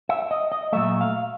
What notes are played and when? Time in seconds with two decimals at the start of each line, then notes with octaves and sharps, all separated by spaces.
0.09 E5
0.31 D#5
0.52 D#5
0.73 A#2 F#3 A3 E5
1.01 F5